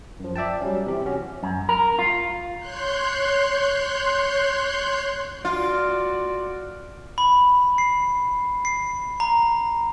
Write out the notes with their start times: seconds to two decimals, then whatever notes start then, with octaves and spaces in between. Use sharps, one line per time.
0.20 F#2 F3
0.36 D5 E5 G5 A5
0.62 F#3 G3 C#4
0.86 C3 E3 G4
1.06 C#4 F#4
1.43 F#2
1.69 A#4
1.99 F4
2.58 C#5 C6 F#6 G6
5.45 F4 F#4 D5
7.18 B5
7.78 C7
8.65 C7
9.20 A#5